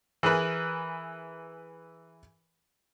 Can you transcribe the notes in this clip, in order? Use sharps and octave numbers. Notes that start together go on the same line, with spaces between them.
E3 G#4 A#4 B4